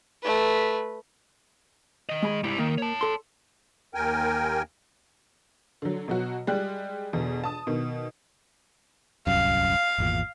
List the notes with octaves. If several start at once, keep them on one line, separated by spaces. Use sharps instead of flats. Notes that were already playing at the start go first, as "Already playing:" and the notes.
A3 B4
D#3 D#5
G#3 G#4 B5
G#2 G3 E4
D#3 A#3
C#5 A5
A4 C6
D#2 A#4 G5 G#5
D3 F#3
B2 F#3 F#4
G3 G#3 G4 F#6
E2 B2 D3
A5 D#6
B2 D#3
D1 C2 F#2 F5
G#1 E2 A#2